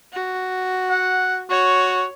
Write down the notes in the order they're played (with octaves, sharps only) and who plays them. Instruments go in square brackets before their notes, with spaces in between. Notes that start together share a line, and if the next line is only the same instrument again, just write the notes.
[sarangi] F#4
[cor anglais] F#5
[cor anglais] F#4 [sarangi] C#5